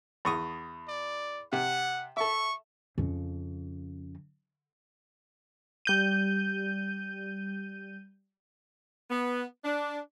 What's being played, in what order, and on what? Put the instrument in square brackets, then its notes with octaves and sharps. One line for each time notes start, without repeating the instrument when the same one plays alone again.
[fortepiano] E2 C#6 D#6
[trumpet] D5
[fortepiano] C3 [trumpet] F#5
[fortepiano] A4 E5 [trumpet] C#6
[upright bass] F2 C#3
[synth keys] G3 G6 D#7
[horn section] B3
D4